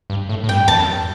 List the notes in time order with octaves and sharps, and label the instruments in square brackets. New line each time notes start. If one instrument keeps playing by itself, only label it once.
[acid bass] G2
A2
A2
[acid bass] G2 [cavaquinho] G5
[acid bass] E2 [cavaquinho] A5
[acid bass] F#2